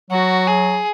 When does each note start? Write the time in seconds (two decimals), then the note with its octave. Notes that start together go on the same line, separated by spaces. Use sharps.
0.10 F#3 F#4
0.47 G#4